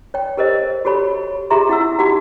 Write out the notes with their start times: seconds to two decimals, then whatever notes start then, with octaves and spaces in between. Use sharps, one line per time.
0.14 C#5 G5
0.37 G4 A4 A#4 C5 D#5
0.85 F#4 G4 A4 C#5 B5
1.50 F4 G4 G#4 E5 A#5 C6
1.69 E4 F#5 E6
1.99 D#4 F#4 G4 F#5